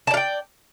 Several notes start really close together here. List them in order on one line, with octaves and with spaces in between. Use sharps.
A5 D5 F5 G5